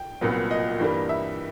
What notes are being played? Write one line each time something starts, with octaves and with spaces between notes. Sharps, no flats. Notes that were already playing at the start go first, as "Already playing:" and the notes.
Already playing: G5
C2 A#2 F#3 B3
D#5
G2 E3 G3 A#3
E5